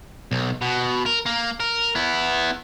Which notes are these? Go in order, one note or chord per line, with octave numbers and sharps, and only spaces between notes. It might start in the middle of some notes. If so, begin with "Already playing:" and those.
B1
B2
A#4
A#3
A#4
B3 E4